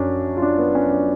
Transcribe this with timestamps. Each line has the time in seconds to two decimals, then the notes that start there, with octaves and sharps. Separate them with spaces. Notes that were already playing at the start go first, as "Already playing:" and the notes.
Already playing: F#2 F3 C#4 D4
0.37 F4
0.42 D4
0.59 B3
0.75 C#4
0.91 D4